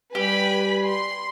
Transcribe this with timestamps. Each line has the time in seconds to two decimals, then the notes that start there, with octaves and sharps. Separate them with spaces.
0.15 G3 G4 B4 G#5 B5
0.85 C6